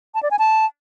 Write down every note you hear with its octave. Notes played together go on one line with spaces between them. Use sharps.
A5
D5
G#5
A5